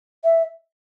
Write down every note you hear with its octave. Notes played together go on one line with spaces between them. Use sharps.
E5